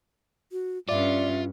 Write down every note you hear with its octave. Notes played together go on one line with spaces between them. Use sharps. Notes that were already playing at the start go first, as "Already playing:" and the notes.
F#4
G2 C#4 F4 D5 E5